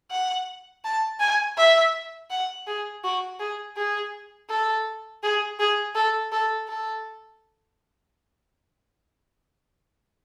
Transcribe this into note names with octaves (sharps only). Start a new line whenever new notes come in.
F#5
A5
G#5
E5
F#5
G#4
F#4
G#4
G#4
A4
G#4
G#4
A4
A4
A4